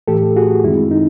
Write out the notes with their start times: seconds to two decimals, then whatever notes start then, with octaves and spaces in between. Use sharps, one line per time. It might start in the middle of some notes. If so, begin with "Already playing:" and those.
0.08 A2 E3 A3 G4 A4
0.36 F#4 G#4
0.64 F#2 D#3 G#3 C4 E4
0.91 D#4